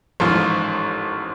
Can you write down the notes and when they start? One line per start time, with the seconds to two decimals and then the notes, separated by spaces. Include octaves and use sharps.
0.20 A1 G#2 F3